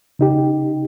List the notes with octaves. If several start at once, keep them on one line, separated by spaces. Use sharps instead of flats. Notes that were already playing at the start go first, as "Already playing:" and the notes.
C#3 D#4 G4